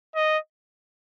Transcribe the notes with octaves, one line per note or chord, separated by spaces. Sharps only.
D#5